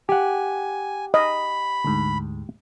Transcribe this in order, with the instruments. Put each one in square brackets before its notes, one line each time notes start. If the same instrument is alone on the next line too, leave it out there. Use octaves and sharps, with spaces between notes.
[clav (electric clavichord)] G4 F#5 [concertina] G#5
[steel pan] D#5 [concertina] B5
[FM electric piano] D2 G#2